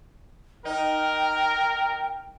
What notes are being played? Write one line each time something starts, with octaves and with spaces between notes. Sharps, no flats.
D#4 A#4 G5